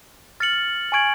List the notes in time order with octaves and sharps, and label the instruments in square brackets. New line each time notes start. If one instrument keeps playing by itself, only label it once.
[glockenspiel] F6 A6 C#7 F#7
G#5 C#6 G#6 D7 F#7